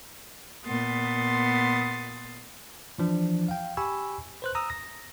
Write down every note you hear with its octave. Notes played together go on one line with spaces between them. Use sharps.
A#2 B3 C6 D#6 A6
E3 F3 D4
F5 G5
G4 G#5 B5 C#6 E6
B4 C5 F#6
A#5 D#6 E6
A#6